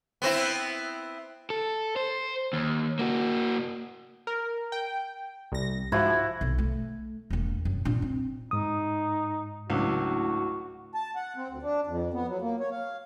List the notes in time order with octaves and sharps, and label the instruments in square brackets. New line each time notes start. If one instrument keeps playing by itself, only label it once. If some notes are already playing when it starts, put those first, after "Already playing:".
[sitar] B3 C4 E4
[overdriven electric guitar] A4
C5
D#2
A#3 F#4
[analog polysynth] A#4
G5
C2 A#6
[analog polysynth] G#2 F3 [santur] E4 F#4
[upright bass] B1
A3
E1 A#3
F#2
A#2 D4
C4
[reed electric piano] G#2 D#6 [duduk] D#4
[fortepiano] C#2 F#3 [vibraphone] A3 D4 E4 [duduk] F#4
[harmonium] A5
F#5
C4
D2
D4
F2
B3
F#3
A#3
C#5
F5